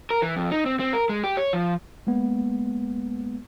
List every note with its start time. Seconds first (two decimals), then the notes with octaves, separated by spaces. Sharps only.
0.10 A#4
0.22 E3
0.37 F2
0.52 D#4
0.66 C4
0.80 C4
0.93 A#4
1.09 G#3
1.24 G4
1.37 C#5
1.53 F3
2.07 G#3 A#3 B3